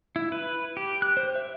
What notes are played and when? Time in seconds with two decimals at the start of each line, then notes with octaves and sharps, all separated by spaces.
0.16 E4
0.32 B4
0.77 G4
1.02 F#6
1.17 C5
1.36 E5